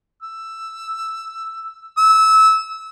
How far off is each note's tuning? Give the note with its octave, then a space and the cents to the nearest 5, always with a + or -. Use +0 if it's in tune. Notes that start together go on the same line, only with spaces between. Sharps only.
E6 +5
E6 -20